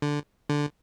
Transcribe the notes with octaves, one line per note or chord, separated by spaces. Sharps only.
D3
D3